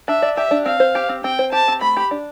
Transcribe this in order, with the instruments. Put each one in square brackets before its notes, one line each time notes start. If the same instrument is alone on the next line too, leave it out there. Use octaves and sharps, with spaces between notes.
[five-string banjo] D4 [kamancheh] E5
[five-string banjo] D5
[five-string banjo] G4 [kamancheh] E5
[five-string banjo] D4
[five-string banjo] C4 [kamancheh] F5
[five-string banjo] C5
G4
C4
[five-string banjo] C4 [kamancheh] G5
[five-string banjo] C5
[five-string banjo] G4 [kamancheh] A5
[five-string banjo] C4
[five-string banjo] A3 [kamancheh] B5
[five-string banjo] G4
D4